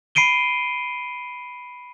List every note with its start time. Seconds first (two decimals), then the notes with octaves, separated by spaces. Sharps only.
0.15 B5 C7 D7 D#7 G7